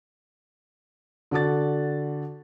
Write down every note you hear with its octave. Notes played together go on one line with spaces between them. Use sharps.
D3 F#4 D5 A6